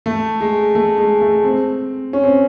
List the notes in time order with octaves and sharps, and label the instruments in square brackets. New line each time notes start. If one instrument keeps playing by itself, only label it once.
[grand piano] A3
G#3
A3
G#3
A3
C4
C#4
C4